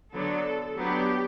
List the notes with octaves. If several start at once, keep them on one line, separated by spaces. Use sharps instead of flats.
D3 F#3 B3 D4 A4
F#3 B3 D4 G4